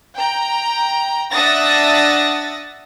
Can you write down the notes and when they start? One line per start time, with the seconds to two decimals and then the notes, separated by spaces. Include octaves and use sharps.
0.17 G5 A#5
1.32 D4 E5 F#5 D#6 A6 A#6